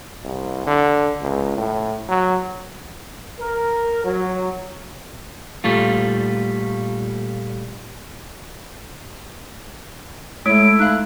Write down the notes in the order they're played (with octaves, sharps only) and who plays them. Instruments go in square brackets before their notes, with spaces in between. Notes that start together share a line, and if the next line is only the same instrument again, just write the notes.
[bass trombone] C2
D3
C#2
A2
F#3
[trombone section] A#4
F#3
[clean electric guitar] A#2 G3 A3 F4
[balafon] G#3 C#5 [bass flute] A3 [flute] E4 [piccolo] D7
[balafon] D#4 F5 [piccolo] F#6